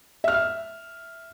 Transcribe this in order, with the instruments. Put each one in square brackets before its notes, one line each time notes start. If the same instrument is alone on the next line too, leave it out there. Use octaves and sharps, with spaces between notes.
[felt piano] E5 F6